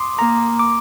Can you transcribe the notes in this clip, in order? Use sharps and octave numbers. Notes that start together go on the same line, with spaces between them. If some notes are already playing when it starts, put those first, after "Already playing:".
Already playing: C6 D6 D#6
A#3 A#5
D6